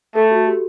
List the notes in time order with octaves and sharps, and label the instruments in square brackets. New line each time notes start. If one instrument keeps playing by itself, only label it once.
[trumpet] A3 [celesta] A4
[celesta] F#4
G4